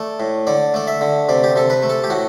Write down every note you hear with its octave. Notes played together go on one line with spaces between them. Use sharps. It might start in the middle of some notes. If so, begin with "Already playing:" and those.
Already playing: A3 D5
A2
D3 D5
A3 D5
E5
D3
C3 D5
G4
C3 A4
B4
A3
A4
G4
A2 F#4